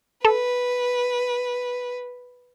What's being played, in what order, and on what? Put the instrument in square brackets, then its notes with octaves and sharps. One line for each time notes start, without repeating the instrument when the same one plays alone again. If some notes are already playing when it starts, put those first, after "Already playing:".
[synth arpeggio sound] A4 [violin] B4